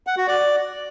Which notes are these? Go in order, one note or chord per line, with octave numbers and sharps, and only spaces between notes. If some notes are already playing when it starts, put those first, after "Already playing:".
F#5
F#4
D5